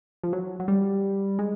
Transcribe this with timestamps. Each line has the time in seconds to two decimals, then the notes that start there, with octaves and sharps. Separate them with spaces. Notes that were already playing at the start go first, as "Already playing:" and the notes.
0.23 F3
0.33 F#3
0.60 F#3
0.68 G3
1.39 G#3